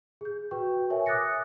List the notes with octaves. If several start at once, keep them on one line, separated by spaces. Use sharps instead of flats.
G#4 G6
F#4 B4 G5 C#6
A#4 C#5 E5 G#5
D6 D#6 F#6 A6 A#6 C#7